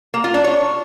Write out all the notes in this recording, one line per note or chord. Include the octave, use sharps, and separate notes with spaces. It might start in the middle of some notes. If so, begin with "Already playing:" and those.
A#3
F4
D4
C#5